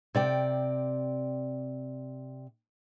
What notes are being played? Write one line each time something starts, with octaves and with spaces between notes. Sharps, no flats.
C3 D5 G5